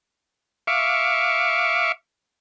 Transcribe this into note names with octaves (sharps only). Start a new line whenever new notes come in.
E5 F5 C#6 D6